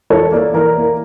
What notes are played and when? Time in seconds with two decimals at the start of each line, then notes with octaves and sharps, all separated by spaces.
0.10 E3 A4 C#5
0.32 A#3 A#4 D5
0.53 E3 A#4 D5
0.76 A#3